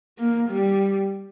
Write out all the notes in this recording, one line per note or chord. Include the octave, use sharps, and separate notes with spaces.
A#3
G3